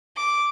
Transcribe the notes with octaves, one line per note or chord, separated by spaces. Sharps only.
D6